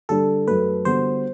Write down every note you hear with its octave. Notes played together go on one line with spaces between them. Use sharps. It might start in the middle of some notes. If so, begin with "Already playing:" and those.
D3 G3 D4 A4
F#2 F#3 A3 B4
D3 G3 B3 F#4 C5